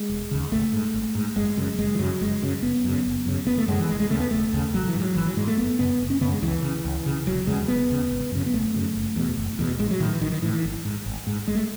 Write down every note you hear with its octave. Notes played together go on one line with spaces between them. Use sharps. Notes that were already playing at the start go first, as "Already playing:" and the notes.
Already playing: G#3
E1
D#2 C#3
G#1 A3
G#2
G#1
G#2
F#1 G#3
F#2 C#3
F#1 G#3
E3
F#2 C#3 F#3
F#1 G#3
F#2 C#3
F#1 B3
F#2 C#3
F#1
F#2 C#3
F#1 B3
A3
F#2 C#3 G#3
E3
E1 G#3
G#3
D#2 C#3 A3
B3
E1 A3
D#2 C#3
G#1 F#3
E3
G#2
F#3
G#1 E3
F#3
G#2 G#3
A3
F#1 B3
F#2 C#3 B3
F#1
C#4
F#2 C#3 B3
G#3
C#2 E3
C#3
C#2
C#3
E1 F#3
E2 C#3 G#3
E1 B3
E2 C#3
G#1
F#2 C#3
B3
G#1 A3
F#2 C#3
F#1
E2 B2
F#1
E2 B2
A1 G#3
F#3
A2 D#3
E3
A1 D#3
D#3
A2 E3
E3
G#1
G#2
G#1
G#2
G#1 G#3
A3